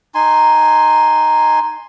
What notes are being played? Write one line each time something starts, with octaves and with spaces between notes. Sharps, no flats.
D#4 G#5 C6